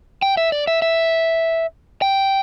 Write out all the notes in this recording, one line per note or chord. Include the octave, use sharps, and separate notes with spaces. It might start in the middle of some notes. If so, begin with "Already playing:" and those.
G5
E5
D5
E5
E5
G5